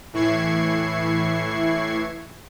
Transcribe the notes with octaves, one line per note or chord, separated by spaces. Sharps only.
A2 E3 E4 C#6 G#6 C7